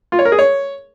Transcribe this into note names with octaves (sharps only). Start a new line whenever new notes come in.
F4
C#5
A#4
G#4
C#5